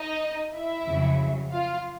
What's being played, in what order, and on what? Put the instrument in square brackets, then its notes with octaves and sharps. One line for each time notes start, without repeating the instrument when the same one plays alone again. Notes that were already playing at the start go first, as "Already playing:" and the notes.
Already playing: [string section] D#4 D#5
E4 E5
F2 C#3 F#3
F4 F5